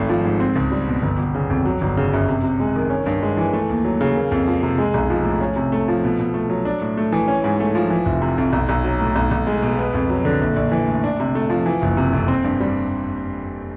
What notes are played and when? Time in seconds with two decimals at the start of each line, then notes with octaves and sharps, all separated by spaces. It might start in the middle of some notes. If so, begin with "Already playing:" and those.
Already playing: G#1 A3
0.09 F3
0.24 G#2
0.40 C4
0.56 C#2
0.72 G3
0.87 B2
1.02 G1
1.18 G1
1.35 C#3
1.50 F2
1.65 F#3
1.81 G1
1.97 C#3
2.13 F#2
2.28 C3
2.43 C3
2.60 G#3
2.76 D#3
2.90 C#4
3.06 G2
3.22 G#3
3.37 E3
3.53 A3
3.69 D#2
3.85 F#3
4.01 C#3
4.15 A#3
4.32 F2
4.47 F3
4.63 C3
4.78 G#3
4.94 B1
5.10 F3
5.24 A2
5.41 C#4
5.56 C3
5.72 A3
5.88 F3
6.04 B2
6.19 B2
6.34 A3
6.50 F#3
6.65 D4
6.81 A2
6.97 A3
7.12 E3
7.28 C#4
7.44 G#2
7.60 A3
7.75 F3
7.90 E3
8.06 F1
8.22 C3
8.38 F2
8.53 B1
8.69 B1
8.84 F#3
9.00 A2
9.16 B1
9.31 B1
9.47 G#3
9.62 B2
9.79 B3
9.94 F2
10.10 F#3
10.25 D3
10.41 A#1
10.56 A#1
10.72 E3
10.87 A2
11.04 D4
11.20 C3
11.35 A3
11.50 F3
11.66 E3
11.82 F#1
11.97 C3
12.13 F2
12.28 C4
12.44 G2
12.60 G3